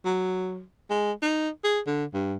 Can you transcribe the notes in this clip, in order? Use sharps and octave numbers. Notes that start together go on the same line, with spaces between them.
F#3
G#3
D#4
G#4
D3
G2